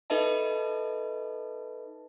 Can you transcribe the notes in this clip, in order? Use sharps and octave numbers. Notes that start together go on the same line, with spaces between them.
D#4 A4 B4 D#5 E5 A5